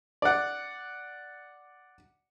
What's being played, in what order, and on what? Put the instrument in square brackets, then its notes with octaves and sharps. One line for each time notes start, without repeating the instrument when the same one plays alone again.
[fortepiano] D5 F#5